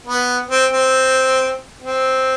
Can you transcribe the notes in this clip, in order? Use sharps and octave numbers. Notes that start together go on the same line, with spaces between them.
B3
C4
C4
C4